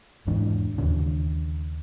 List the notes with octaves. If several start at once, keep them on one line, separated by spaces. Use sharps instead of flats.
E2 G#2 E3 D4
D#2 C#3 D4